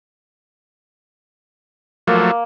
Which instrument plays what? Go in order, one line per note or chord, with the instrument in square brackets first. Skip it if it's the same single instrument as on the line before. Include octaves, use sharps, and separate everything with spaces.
[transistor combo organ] F3 F#3 A3 [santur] A#3